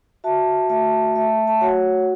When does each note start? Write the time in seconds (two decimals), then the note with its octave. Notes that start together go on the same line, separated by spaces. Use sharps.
0.24 F#4 E5 A5
0.69 A3 E5 A5
1.16 A3 E5 A5
1.47 A5
1.61 F#4 C#5 F#5